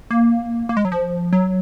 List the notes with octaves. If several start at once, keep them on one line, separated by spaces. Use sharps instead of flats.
A#3
A#3
G#3
F#3
F3
F#3